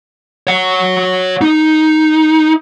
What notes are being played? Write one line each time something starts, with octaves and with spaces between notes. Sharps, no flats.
C#5 F#5
D#4